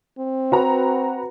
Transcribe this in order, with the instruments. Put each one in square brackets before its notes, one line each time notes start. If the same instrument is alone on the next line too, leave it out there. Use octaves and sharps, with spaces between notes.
[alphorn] C4
[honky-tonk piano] F#4 B4 A#5